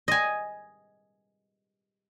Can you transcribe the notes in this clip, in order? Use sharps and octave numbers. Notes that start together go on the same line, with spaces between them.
D#5 G#5